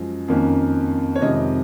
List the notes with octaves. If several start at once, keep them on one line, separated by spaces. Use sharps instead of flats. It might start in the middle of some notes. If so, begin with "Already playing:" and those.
Already playing: F#2 F3 G#3
F2 D#3 A#3 C#4
C#5
F2 C3 D#3 G#3 D#5